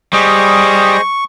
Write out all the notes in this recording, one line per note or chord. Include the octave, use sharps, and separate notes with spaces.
G3 G#4 C5 D#5 C#6